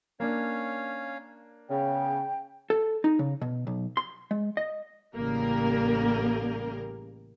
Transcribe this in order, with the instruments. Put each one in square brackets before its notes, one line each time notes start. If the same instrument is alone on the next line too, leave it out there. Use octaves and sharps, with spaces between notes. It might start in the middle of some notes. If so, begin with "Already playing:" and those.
[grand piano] A#3 D4 [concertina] C#4 C#5 F5
[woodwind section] C#3 [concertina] B3 [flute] G5
[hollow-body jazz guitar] A4
D#4
C#3
B2
B1
C6
G#3
D#5
[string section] A1 C#3 G3 A#3 A#4